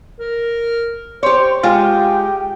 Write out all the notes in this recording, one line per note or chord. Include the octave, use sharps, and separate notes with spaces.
A#4
G4 C5 C#5 C6
G#3 F4 G4 G5